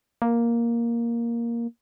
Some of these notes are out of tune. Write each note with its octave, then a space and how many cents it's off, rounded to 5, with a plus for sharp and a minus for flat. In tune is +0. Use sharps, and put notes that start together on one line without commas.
A#3 +5